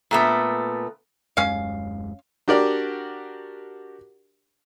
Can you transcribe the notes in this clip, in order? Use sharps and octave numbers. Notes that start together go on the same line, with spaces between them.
A#2 A3 B3
D#1 F#2 G#3 C#4 F5
D4 F#4 G4 A#4 D5